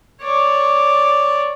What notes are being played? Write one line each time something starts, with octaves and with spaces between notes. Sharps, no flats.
C#5 D5